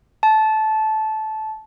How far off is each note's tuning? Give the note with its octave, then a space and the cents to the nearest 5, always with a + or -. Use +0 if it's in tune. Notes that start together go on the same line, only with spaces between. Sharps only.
A5 -15